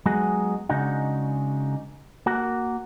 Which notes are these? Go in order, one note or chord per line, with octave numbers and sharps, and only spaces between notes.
F#3 G#3 B3 D#4 F#4 G#4
C#3 G#3 D4 D#4 F#4
A#3 F#4 A#4